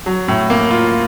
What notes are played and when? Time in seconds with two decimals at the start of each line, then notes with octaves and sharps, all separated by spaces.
0.06 F#3
0.28 A2
0.50 A#3
0.71 F4